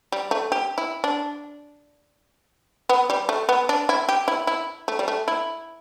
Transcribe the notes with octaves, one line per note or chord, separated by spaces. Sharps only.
G3
A3
G4
E4
D4
B3
G3
A3
B3
D4
E4
G4
E4
E4
A3
G3
A3
E4